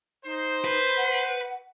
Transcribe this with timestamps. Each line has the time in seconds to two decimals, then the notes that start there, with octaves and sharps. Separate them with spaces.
0.24 D#4 C5
0.65 B4
0.97 F#5